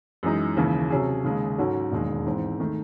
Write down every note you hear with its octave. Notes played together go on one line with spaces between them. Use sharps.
F#2 E3 G#3 D#4
D#2 C#3 E3
C3 F#3 C#4 G#4
D#2 C#3 G#3
G#2 F#3 C#4 F#4 A4
E1 D#2 D#3 G#3
G#2 E3 C4
D#3 A3